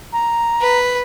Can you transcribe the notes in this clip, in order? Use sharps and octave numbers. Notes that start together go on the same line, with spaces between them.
A#5
B4